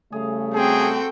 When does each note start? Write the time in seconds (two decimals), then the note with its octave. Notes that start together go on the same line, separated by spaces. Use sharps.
0.12 C#3 G3 A3 G#4 F5
0.54 C4 F#4 G#4 A4 G5